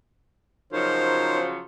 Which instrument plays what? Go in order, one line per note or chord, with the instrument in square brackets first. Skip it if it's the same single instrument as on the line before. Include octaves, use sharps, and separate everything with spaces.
[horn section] C#3 F3 F#3 [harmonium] D#4 A#4 C#5 [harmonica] C5